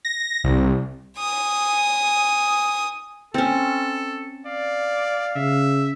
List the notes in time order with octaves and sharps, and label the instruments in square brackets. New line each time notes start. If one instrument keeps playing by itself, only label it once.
[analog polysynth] A#6
C2
[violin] G#5 D#6
[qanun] C4 C#4 [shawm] A4
[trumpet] D5 [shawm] F5
[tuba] C#3 [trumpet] E5